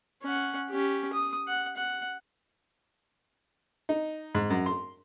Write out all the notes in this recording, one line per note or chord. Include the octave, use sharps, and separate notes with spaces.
C#4 F#5
C#4 G4
D#6
F#5
F#5
D#4
G#2
F#2
C6